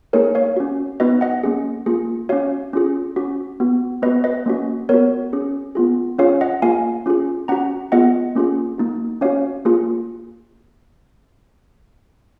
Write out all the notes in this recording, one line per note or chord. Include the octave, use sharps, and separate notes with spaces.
A#3 D#4 G#4 A#4 C#5
C#5 F5
C#4 F#4
B3 D#4 F#4 B4 D#5
D#5 F#5
A#3 C#4 G#4
A#3 F4 G#4
C#4 F#4 C#5 F5
C#4 F4 G#4
C#4 F#4
B3 F#4
B3 F#4 B4 D#5
B4 D#5
A#3 C#4 F#4
B3 F#4 A#4 C#5
C#4 G#4
B3 F4 G#4
C#4 F4 G#4 C#5 F5
D#5 F#5
A#3 F4 G#4 F5 G#5
C#4 F4 G#4
C#4 F#4 F#5 A#5
B3 F4 G#4 D#5 F#5
A#3 C#4 F4 G#4
A#3 D#4 F#4
C#4 F#4 C#5 F5
A#3 F4 G#4